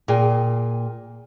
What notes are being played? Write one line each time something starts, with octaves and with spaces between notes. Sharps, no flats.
A#2 G#4 G5